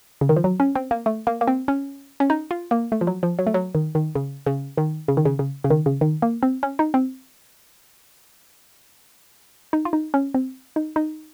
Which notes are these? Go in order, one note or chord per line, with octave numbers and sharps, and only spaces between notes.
C#3
D#3
F3
F#3
C#4
C4
A#3
A3
A#3
A#3
C4
C#4
C#4
D#4
F4
A#3
A3
F3
F#3
F3
F#3
A3
F#3
D#3
D#3
C#3
C#3
D#3
C#3
D#3
C#3
C#3
C#3
D#3
C#3
D#3
A#3
C4
C#4
D#4
C4
D#4
F4
D#4
C#4
C4
D#4
D#4